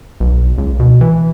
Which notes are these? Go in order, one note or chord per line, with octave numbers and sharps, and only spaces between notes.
B1
C#2
B2
E3